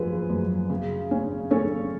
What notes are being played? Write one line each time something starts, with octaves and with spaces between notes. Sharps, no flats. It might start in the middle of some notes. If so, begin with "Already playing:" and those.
Already playing: F#2 F3 G#4 B4
F#2
C#3
C#4
C#4 A4 C#5